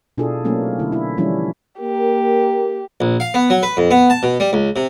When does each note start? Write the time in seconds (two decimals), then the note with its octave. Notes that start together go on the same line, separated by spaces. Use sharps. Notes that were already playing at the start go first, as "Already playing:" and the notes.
0.18 B2 D4 E4 F4 G#4 A4
0.44 F#3 A3 A#3 C4 C#4 D#4
0.79 D3 E4
0.92 E4
1.17 E3 F3 G3 C#4 D4 E4
1.81 A#3 G4 A#4
3.01 A#1
3.20 F5
3.34 B3
3.50 F#3
3.63 B4
3.77 F2
3.91 B3
4.10 A5
4.23 B2
4.40 G3
4.53 C#2
4.76 C3